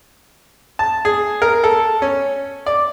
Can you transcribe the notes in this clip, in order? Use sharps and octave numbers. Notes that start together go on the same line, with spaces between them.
A5
G#4
A#4
A4
C#4
D5